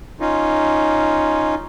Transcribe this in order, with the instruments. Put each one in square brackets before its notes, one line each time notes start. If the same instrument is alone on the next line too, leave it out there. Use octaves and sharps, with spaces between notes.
[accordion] C#4 D#4 F4